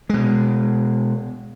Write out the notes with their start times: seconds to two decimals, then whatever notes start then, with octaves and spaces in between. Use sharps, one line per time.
0.09 B2 G#3